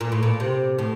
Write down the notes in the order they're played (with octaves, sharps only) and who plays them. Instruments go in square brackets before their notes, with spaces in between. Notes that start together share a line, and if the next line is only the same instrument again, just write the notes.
[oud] A#2
A2
A#2
C3
A2